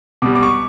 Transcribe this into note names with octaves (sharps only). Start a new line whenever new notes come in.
B2 G3 D6
D6
C#6